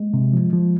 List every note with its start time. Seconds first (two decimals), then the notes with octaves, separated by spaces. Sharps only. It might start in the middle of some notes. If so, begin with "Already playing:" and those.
Already playing: G#3 A#3
0.14 C3
0.33 F3
0.53 F3